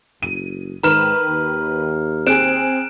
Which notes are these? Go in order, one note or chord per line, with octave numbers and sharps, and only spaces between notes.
F#1 D#7
G#2 D#3 B4 A#5 F6 E7
D#2
C4 G#4 F#6 D7 E7